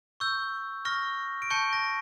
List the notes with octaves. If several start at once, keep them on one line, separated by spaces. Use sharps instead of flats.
C#6 E6 G6
C#6 F6 A#6
D7
A5 C#6 G6 C#7
A#6